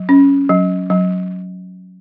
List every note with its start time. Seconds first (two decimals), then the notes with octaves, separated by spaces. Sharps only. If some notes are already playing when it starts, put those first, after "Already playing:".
Already playing: F#3
0.09 C#4
0.49 F#3
0.90 F#3